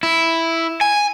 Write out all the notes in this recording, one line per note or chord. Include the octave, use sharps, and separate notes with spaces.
E4
G#5